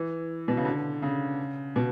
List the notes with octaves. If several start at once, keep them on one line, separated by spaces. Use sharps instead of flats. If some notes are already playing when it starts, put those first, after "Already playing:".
Already playing: E3
B2
C#3
D3
C#3
B2